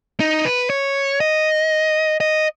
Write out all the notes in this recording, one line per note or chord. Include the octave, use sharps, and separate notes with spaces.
D#4
B4
C#5
D#5
D#5